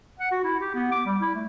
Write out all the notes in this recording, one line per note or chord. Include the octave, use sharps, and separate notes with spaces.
F#5
F#4
E4
G4
B3
D6
G3
E4
A3